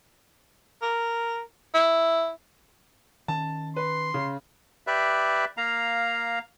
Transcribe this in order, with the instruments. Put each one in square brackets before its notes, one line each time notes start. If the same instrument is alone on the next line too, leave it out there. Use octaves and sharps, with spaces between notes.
[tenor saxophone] A#4
E4
[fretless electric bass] D#3 C#4 [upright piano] A5
[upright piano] B4 [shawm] C6
[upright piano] C#3
[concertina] G4 B4 D5 E5
A#3 F5 A#5